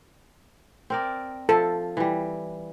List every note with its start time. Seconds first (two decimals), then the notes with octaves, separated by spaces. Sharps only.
0.90 C4 A#4 D5
1.49 F3 A4
1.97 E3 G3